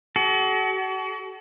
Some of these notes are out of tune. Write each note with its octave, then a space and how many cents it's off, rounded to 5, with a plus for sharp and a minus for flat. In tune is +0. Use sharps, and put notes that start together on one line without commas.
F#4 +40 A4 -45